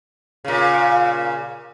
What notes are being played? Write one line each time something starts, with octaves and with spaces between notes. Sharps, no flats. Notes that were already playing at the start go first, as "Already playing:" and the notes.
A#2 C#3